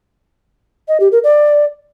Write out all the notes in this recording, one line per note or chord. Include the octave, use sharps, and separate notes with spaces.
D#5
G4
A#4
D5